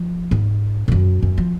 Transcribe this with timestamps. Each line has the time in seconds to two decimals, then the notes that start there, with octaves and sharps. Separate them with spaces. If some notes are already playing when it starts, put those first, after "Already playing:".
Already playing: F3
0.31 G#2
0.88 G#2
0.92 F#2
1.22 F#2
1.38 F3